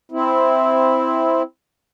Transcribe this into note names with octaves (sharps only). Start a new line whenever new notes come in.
C4 E4